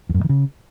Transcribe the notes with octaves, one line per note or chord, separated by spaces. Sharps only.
E2
F#2
A2
D#3
C#3